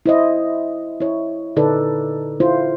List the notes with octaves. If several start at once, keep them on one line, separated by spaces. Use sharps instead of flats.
E4 C5 D#5
E4 C#5
A#2 D3 D#4 A4 B4 D5
E4 F4 C5